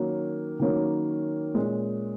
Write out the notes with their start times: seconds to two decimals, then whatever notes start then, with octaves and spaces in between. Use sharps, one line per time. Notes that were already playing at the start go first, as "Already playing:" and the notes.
Already playing: D#3 F#3 A#3 C#4
0.60 D#3 F#3 A#3 C#4
1.55 A#2 G#3 C#4